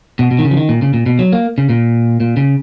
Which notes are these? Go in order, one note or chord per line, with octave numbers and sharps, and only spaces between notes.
B2
B2
D#3
C#3
F3
D#3
A#2
C#3
A#2
B2
F#3
A#3
C#3
A#2
A#2
C#3